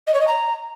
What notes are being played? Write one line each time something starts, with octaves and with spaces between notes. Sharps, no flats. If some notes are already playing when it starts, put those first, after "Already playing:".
D#5
C#5
D#5
A#5